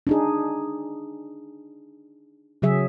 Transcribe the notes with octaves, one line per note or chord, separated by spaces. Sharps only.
D4 D#4 G#4
C#3 F#3 G#4 E5